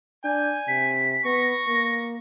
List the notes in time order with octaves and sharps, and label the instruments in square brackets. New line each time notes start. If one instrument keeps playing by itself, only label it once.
[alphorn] D4 [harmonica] G#5 [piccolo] G6
[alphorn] C3 [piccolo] B6
[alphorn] B3 [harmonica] C#6 [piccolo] A#6
[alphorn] A#3